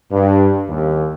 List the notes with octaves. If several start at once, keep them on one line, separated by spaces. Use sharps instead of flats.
G2
D#2